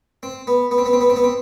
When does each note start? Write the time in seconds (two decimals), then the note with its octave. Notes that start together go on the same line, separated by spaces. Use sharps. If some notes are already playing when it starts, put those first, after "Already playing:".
0.23 C4
0.47 B3
0.71 B3
0.78 C4
0.86 B3
0.93 C4
1.01 B3
1.10 C4
1.16 B3
1.24 C4